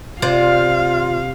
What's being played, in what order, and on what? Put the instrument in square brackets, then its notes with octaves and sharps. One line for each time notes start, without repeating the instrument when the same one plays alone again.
[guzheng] C3 C5 D5 [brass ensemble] F4 [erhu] F5